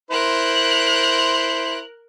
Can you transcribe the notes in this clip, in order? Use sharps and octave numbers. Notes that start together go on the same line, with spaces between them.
E4 A#4 C5 F#6